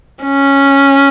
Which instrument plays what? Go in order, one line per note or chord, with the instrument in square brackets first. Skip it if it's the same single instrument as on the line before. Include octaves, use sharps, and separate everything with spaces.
[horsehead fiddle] C#4